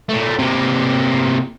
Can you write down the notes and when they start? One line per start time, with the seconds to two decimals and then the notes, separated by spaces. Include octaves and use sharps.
0.09 A#2 A3
0.39 C3 A#3